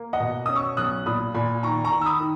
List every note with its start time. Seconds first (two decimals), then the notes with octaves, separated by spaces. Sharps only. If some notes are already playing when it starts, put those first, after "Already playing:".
Already playing: A#3
0.13 D#5 F#5
0.20 B2
0.46 C#4 D#6
0.56 C#6 E6
0.77 B1 D#6 F#6
1.06 A#2 B5 D#6
1.34 A#2 G#5 B5
1.63 D#3 A#5 C#6
1.85 A#5 C#6
1.92 D#3
2.01 E6
2.06 B5 D#6
2.20 D#3